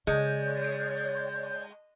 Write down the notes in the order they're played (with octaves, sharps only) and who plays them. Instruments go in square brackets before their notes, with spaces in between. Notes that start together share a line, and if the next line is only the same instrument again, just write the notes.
[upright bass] C#3 [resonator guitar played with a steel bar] G#3 [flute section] C#5 D5 [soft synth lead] G6